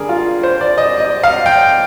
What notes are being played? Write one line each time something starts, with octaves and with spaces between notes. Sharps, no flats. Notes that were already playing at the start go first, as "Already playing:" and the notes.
Already playing: D3 G3 G#4 A#4
F4
C5
D5
D#5
D#5
F5
G5